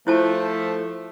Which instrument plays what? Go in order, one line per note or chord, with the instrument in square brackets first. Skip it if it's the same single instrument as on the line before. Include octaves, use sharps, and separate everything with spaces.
[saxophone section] F3 A3 [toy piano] E4 C5 A5